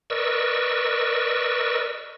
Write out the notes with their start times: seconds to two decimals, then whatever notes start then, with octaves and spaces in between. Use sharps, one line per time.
0.10 A#4 B4 D5 D#5 C#6 E6